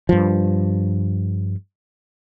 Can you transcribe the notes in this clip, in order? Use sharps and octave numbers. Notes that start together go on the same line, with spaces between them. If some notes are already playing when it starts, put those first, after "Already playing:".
G2 F3